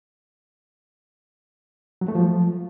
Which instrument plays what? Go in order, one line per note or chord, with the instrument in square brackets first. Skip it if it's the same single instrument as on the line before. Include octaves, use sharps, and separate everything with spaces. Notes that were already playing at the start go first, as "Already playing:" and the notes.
[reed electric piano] F#3
A3
F3